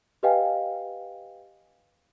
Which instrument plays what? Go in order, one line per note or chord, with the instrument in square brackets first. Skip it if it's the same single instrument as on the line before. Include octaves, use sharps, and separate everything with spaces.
[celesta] G4 B4 D#5 F5 G5 G#5